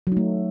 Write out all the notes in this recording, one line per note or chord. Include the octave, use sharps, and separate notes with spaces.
F#3 A3 D#4